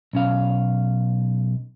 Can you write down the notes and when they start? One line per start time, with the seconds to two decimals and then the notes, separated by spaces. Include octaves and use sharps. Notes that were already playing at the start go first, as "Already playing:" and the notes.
0.13 B1 C#4 F5